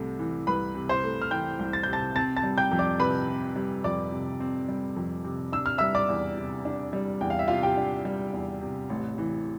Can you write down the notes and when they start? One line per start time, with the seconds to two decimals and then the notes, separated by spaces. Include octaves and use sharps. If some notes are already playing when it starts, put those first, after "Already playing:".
Already playing: C2 C3 A3
0.19 E3
0.47 C2 B4 B5
0.75 C3
0.89 C5 C6
1.04 A3
1.22 F6
1.31 E3 G5 G6
1.59 C2
1.73 A6
1.83 C3 G6
1.93 A5 A6
2.16 C4 A5 A6
2.37 A5 A6
2.43 G3
2.58 G5 G6
2.71 F2
2.79 D5 D6
3.00 C3 B4 B5
3.28 C4
3.56 G3
3.84 F2 D5 D6
4.12 C3
4.40 C4
4.69 G3
4.96 F2
5.25 C3
5.52 D4 E6
5.66 F6
5.78 G3 E5 E6
5.95 D5 D6
6.09 E2
6.37 C3
6.65 D4
6.93 G3
7.21 E2 G5
7.30 F5
7.39 E5
7.48 C3 F4 F5
7.63 G4 G5
7.77 D4
8.05 G3
8.33 E2
8.62 C3
8.90 A1
9.18 E3